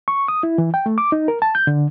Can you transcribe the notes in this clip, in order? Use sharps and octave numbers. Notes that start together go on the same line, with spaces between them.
C#6
D#6
E4
E3
G5
A3
D6
D#4
A#4
A5
G6
D3